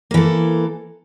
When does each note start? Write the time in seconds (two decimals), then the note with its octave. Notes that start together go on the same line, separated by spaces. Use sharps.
0.11 A#3
0.14 E3
0.17 A4